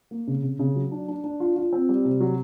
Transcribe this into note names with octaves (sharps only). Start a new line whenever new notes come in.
A#3
C#3
C#3
C#3
F#3
D4
D4
D4
F4
F4
C4
G3
C3
F#3